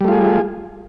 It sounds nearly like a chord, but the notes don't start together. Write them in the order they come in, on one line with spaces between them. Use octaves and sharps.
G3 A3 F4 G#4